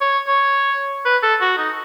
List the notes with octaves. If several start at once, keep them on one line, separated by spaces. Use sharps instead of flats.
C#5
C#5
B4
A4
F#4
D#4